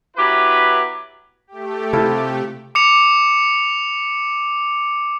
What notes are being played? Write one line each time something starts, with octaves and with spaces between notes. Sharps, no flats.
F#3 B3 E4 G4 B4
A3 G4
C3 E4 F4 A4
D6 C#7 F7